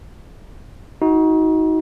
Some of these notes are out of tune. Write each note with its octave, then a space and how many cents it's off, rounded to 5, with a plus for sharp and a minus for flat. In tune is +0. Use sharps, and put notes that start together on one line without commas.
D#4 +30 F#4 +0